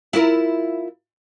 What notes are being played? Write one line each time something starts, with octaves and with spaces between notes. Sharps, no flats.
E4 F4 A#4